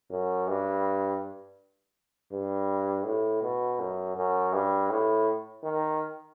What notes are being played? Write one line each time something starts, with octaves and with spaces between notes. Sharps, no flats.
F#2
G2
G2
A2
B2
F#2
F#2
G2
A2
D#3